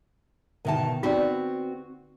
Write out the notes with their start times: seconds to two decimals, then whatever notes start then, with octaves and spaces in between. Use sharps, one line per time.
0.65 B2 D3 D#3 E5 A5
1.03 B3 C4 D#4 F#4 D5